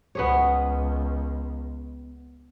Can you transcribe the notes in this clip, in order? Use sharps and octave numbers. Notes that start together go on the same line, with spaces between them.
C#2 B3 G#4 C#5